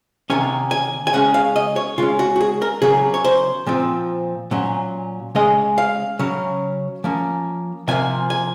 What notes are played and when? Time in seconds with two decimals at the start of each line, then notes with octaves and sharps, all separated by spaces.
0.30 C3 D#3 A#3 C#4 G#5
0.71 G#5
1.07 G#5
1.13 C#3 G#3 C#4 F#5
1.34 F5
1.56 D#5
1.76 C#5
1.98 C#3 G#3 C#4 F4
2.19 F#4
2.36 F#4
2.41 G#4
2.62 A#4
2.82 C#3 F#3 A#3 C#4 G#4
3.14 C#5
3.24 C5
3.66 A#2 F3 C4
4.51 A#2 F#3 C#4
5.35 C#3 G#3 C#4 D#5
5.78 F5
6.19 C#3 F#3 C#4
7.04 F3 A#3 C#4
7.88 C3 F3 A#3 G#5
8.30 G#5